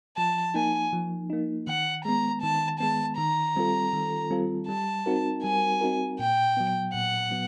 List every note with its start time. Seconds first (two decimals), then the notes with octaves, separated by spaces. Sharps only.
0.17 F3 A5
0.54 A#3 D#4 G#5
0.93 F3
1.30 A#3 D#4
1.67 D#3 F#5
2.05 G#3 B3 A#5
2.42 D#3 A5
2.80 G#3 B3 A5
3.17 D#3 A#5
3.56 G3 C4 F4 A4
3.93 D#3
4.30 G3 C4 F4 A4
4.68 G3 A5
5.06 C4 D#4 F#4 A#4
5.43 G3 G#5
5.81 C4 D#4 F#4 A#4
6.19 A#2 G5
6.57 F#3 B3
6.93 A#2 F#5
7.31 F#3 B3